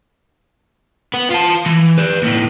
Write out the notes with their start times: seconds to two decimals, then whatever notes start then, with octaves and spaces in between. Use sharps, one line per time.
1.14 B3
1.30 F4 A5
1.66 E3
1.98 B4 D5
2.22 D#2 A2